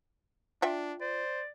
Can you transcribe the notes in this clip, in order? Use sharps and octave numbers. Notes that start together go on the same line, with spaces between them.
D4 F4 E5 G5
C5 D5